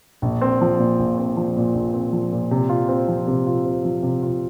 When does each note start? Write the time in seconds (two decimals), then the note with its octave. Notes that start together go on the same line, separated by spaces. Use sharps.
0.22 A#1
0.41 C4
0.61 F3
0.79 A#2
0.99 A#1
1.18 C4
1.37 F3
1.57 A#2
1.75 A#1
1.94 C4
2.13 F3
2.32 A#2
2.51 C3
2.69 F4
2.88 C4
3.08 F3
3.27 C3
3.47 F4
3.65 C4
3.85 F3
4.03 C3
4.23 F4